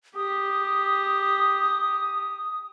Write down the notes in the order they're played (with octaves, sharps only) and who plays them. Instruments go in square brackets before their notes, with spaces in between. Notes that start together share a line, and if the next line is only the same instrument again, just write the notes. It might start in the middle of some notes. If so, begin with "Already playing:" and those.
[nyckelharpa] G4 [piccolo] D#6